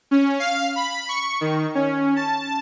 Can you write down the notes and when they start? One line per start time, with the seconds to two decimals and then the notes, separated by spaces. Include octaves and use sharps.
0.11 C#4
0.40 F5
0.76 B5
1.09 C#6
1.41 D#3
1.75 C#4
2.16 A5